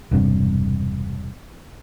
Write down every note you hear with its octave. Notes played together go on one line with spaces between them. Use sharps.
E1 G2 C3